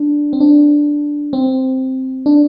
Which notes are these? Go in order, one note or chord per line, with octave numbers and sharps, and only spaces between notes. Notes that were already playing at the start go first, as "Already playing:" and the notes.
Already playing: D4
C4
D4
C4
D4